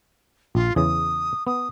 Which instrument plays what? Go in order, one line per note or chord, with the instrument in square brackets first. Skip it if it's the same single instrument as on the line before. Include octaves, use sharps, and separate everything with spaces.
[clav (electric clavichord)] A#1 [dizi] F4
[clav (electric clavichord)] E2 C#3 E3 [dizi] D#6
[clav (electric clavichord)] B3 [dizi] D#6